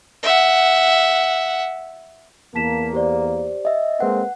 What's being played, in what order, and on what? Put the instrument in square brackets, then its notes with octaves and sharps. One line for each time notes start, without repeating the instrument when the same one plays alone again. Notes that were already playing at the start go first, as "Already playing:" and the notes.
[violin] E5 F#5
[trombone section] E2 A#3 [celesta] A5 B6 E7
[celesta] G4 C5 D5
[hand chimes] D#5 E5
[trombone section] G#3 A#3 C4 [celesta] B4 [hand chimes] F#5